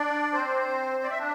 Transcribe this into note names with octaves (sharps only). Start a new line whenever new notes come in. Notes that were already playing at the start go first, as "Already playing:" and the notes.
Already playing: D4 D5
C4 C5
D5
E5
D4